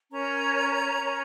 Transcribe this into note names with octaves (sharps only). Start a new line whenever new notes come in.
C#4 A#4 C#5 A#5
C#4 A#4 C#5